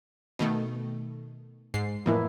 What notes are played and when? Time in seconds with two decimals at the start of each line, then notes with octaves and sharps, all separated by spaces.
0.39 B2 D#3 A3
1.74 G#2 C7
2.06 F2 A2 E3 A#3 E4